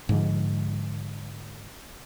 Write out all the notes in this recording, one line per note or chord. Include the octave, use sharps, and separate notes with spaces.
G#2 D3 F3